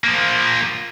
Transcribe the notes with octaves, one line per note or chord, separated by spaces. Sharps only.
F3 A#3